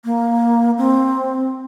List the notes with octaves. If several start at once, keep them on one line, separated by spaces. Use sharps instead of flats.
A#3
C4